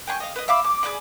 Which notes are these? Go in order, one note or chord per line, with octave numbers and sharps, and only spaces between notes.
G5 G#5 B5 C#6
D#5 F5
B4 D#5
E5 F5 B5 D6
D6
G#4 B4 D5 B5